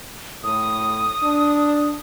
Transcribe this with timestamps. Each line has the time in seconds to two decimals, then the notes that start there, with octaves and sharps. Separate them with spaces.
0.44 A2 D#6
1.23 D4